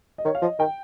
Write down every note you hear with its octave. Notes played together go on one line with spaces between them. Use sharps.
D#5
D#3 C#5
F5
F3 D#5
D#3 G5